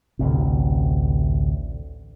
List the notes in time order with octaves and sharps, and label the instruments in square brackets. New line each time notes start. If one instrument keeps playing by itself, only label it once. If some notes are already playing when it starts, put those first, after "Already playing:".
[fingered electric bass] A1 D2 C3